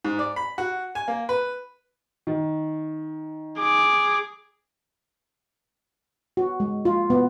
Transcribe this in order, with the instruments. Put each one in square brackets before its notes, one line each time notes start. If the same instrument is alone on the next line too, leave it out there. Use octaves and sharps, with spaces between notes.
[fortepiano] G#2
D5
B5
F#4
G#5
A#3
B4
[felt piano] D#3
[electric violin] G#4 D6
[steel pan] F#4
G#3
F4
B3